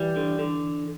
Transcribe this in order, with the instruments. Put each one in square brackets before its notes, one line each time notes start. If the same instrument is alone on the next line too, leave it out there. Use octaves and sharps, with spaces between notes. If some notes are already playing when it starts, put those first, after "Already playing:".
Already playing: [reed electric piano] E3 [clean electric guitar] G3
[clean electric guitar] D3
D3